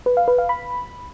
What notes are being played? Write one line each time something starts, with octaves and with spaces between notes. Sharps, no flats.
B4
F5
B4
F5
B5